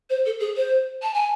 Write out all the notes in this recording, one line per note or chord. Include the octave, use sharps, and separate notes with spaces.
C5
A4
G#4
C5
A5
G#5